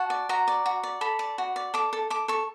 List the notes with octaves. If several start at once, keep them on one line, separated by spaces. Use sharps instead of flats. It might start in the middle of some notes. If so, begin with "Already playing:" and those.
Already playing: F#4 A5
D5
F#4 A#5
D5
F#4
D5
A4 B5
D5
F#4
D5
A4 D6
A4
A4 D6
A4 C#6